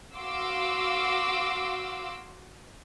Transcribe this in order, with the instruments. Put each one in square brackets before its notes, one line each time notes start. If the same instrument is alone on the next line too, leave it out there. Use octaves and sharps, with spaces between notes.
[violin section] F#4 F5 C6 D6 E6